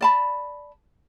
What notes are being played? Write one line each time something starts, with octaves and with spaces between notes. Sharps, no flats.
D5 A5 B5